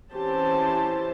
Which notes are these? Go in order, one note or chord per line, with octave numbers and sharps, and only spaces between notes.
E3 C4 C#4 G4 C5 A5